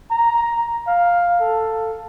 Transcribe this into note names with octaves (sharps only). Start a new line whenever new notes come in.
A#5
F5
A4